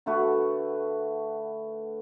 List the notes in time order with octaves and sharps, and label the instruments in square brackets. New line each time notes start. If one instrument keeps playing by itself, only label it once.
[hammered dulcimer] D3 A3 F#4 B4